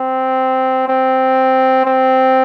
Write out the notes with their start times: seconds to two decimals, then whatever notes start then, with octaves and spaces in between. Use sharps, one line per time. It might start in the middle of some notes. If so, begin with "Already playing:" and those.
Already playing: C4
0.88 C4
1.86 C4